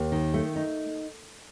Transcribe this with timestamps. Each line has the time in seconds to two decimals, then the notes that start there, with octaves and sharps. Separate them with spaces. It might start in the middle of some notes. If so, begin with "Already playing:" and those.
Already playing: D#2
0.12 D#3
0.34 A3
0.56 D#4